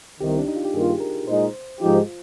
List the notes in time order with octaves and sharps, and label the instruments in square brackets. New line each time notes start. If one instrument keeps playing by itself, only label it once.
[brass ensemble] C2 C3 D#3 [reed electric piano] G4
[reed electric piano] D4
D#4
F4
G4
[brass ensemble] G2 D#3 A#3 F4 [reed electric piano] G#4
[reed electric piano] A#4
[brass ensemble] A#2 G#3 D#4 [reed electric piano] C5
[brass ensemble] G#2 F3 G#3 D#4 G4 [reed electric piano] F4